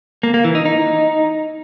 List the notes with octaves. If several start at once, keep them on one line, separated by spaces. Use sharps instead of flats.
A#3
A#3
E3
D#4
D#4